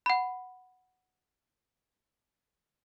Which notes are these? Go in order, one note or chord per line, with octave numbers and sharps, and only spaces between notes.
F#5 B5